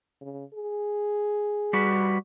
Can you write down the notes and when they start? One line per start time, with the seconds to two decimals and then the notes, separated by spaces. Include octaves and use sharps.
0.21 C#3
0.53 G#4
1.73 G3 F#4 B4